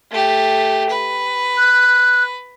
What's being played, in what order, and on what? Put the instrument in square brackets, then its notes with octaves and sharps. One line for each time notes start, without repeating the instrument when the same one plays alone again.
[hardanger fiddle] A3 G4
B4
[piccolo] F#6